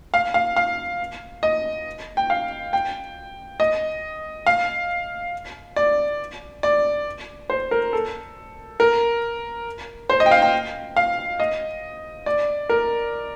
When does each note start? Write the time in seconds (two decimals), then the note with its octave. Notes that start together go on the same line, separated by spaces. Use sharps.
0.14 F5
0.34 F5
0.56 F5
1.43 D#5
2.17 G5
2.30 F5
2.73 G5
3.60 D#5
4.46 F5
5.76 D5
6.63 D5
7.50 C5
7.71 A#4
7.93 A4
8.80 A#4
10.10 C5
10.20 D#5
10.26 G5
10.31 F5
10.42 G5
10.96 F5
11.40 D#5
12.26 D5
12.70 A#4